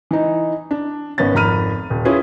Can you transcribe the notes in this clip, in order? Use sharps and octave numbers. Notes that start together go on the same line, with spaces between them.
E3 D#4
D4
G#1 B3 C#4 A6
G#1 F2 A#5 B5 F6 D#7
D#1
C#4 E4 F4 G#4 B4